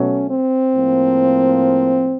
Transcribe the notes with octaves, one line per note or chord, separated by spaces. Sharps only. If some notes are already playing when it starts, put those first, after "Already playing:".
Already playing: B2 F#3 A3 C#4
C4
A2 F3 A#3